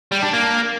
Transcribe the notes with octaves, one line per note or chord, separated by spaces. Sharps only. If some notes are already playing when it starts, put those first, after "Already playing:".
G3
D4
A#3